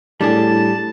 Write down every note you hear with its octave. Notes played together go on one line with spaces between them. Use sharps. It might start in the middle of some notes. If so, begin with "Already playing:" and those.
A2 G3 D4 G#4 A5